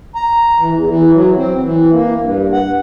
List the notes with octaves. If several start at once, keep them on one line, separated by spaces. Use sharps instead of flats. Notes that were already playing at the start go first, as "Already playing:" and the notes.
A#5
E3
E2
E3
F#3
C4
E3
A#3
G2
F#5